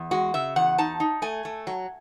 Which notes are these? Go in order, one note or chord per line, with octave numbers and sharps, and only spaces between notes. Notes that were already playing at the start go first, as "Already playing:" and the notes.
Already playing: E2
G#3 F#4
C#3 E5
E2 F#5
D#4 A5
D#4
A3 G#5
A3
F#3